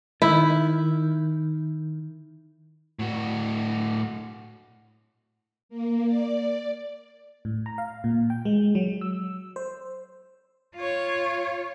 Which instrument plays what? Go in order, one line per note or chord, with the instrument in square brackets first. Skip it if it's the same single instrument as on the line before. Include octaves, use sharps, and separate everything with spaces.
[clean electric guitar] D#3 [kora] E4
[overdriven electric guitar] A2 F#4
[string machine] A#3
D5
[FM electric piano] A2
A#5
F5
A#2
G5
G#3
F#3
E6
C5
[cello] F4 C#5